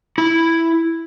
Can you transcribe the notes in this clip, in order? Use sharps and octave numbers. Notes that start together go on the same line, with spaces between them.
E4